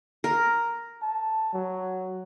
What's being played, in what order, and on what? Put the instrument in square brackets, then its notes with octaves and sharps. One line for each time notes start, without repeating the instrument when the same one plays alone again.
[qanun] A#4
[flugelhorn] A5
F#3